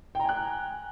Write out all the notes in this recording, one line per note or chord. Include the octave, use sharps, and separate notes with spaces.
G5 G#5 A#5 F#6